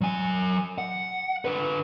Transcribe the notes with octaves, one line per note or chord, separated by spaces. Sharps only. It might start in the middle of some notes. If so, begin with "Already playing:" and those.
F#3 G#5
F#5
D3 B4